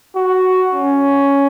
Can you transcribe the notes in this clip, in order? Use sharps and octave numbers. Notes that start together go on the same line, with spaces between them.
F#4
C#4